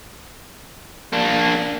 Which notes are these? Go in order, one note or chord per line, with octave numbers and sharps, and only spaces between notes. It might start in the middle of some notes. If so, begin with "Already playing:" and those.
A#3 D4